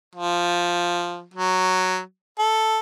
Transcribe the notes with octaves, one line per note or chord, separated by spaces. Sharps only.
F3
F#3
A4